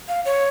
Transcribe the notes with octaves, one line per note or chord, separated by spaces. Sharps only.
F5
C#5